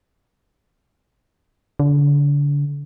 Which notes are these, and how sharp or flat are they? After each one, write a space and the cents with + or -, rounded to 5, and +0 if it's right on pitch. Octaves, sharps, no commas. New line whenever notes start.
D3 -35